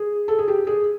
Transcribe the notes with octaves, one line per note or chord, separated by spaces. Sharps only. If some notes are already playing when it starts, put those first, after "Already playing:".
Already playing: G#4
A4
G#4
G4
G#4